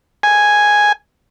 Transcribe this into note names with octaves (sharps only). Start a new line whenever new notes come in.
G#5